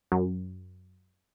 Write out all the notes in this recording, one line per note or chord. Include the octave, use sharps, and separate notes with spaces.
F#2